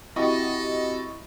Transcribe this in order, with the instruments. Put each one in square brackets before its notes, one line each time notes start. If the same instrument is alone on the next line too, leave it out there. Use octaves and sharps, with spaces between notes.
[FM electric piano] C4 F#4 G4 [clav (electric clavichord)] E4 [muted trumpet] A4 [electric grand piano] D#5 B5 C#6